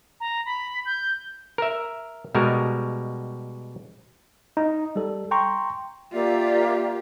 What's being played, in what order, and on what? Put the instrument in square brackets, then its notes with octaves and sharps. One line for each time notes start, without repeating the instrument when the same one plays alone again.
[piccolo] A#5
B5
G6
[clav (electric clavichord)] A#4 E5
B2 G3 G#3 F#4 A#4
[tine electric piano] D#4
G3 A4
G5 A#5 C6 C#6
[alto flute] A#3 [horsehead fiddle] F4 G4 [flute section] D5 E5